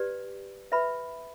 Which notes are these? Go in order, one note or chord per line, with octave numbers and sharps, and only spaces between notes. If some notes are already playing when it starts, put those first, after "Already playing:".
Already playing: G4 B4 D5
B4 E5 B5